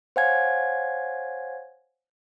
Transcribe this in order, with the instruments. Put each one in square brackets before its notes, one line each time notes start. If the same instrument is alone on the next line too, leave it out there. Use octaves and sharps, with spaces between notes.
[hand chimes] C5 C#5 F5 F#5 G#5 G#6